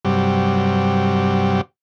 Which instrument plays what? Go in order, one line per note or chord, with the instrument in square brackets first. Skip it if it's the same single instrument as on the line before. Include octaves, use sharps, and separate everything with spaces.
[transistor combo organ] G2 C3 F#3 G3